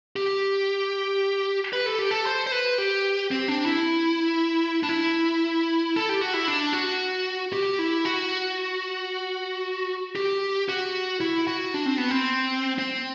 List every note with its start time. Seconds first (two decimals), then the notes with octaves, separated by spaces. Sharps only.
0.16 G4
1.73 B4
1.86 A4
1.99 G4
2.11 A4
2.26 C5
2.47 C5
2.52 B4
2.78 G4
3.31 C4
3.48 D4
3.66 E4
4.83 D4
4.89 E4
5.96 A4
6.09 G4
6.21 F#4
6.34 E4
6.48 D4
6.73 F#4
7.53 G4
7.79 E4
8.05 F#4
10.16 G4
10.69 F#4
11.21 E4
11.47 F#4
11.74 D4
11.86 C4
11.98 B3
12.11 C4
12.78 C4